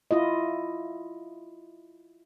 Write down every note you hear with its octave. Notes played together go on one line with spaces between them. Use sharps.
E4 F4 D#5